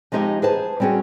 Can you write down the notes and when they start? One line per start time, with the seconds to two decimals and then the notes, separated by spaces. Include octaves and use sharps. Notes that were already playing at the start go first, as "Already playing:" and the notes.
0.12 F3 G#3 D#4 G4 E5
0.42 G#4 B4 C5 A5
0.80 G3 C4 C#4 F#4 G#4